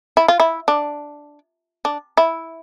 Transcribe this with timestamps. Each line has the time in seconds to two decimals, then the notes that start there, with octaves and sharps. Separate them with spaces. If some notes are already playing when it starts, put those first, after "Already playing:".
0.17 E4
0.28 F4
0.40 E4
0.68 D4
1.85 D4
2.17 E4